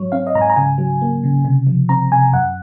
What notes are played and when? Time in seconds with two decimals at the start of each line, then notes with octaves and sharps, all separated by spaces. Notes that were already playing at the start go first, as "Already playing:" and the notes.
Already playing: G#2 F#3 C#5
0.12 C4 F5
0.27 D#5
0.35 G#2 A#5
0.41 G#5
0.50 A#5
0.56 C#3 G#5
0.78 F#3
1.02 A#3
1.23 C#3
1.45 C3
1.67 F3
1.89 C4 A#5
2.12 C3 G#5
2.33 F#2 F#5